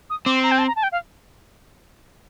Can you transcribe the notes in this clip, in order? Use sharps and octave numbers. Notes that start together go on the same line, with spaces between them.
D#6
C4 D6
C6
A#5
G5
A5
A#5
A5
G5
F5